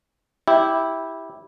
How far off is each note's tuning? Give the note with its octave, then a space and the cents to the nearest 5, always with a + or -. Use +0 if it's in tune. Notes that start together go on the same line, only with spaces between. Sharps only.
E4 -10 G4 +0